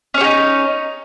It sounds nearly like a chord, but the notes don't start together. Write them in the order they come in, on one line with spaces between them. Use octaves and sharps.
C#4 C#5 G4 D#4